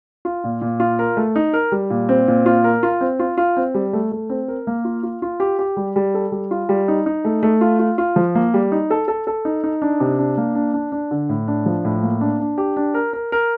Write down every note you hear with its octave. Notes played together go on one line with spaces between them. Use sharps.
F4
A#2
A#2
F4
A#4
A3
D#4
A#4
G3
A#2
C4
A#2
F4
A#4
F4
C4
F4
F4
C4
G3
A3
A3
C4
A#4
A#3
F4
F4
F4
G4
G4
G3
G3
A4
G3
F4
G3
D#4
D#4
A3
A3
F4
F4
F4
F3
A#3
G3
D#4
A4
A4
A4
D#4
D#4
D4
C3
D4
A#3
D4
D4
D4
D3
A2
D4
F3
A2
A#3
D4
D4
G4
D4
A#4
A#4
A#4